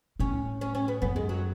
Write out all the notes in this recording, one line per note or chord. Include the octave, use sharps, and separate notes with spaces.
A2 C#4
C#4
C#4
B3
F#2 B3
G#3
F#3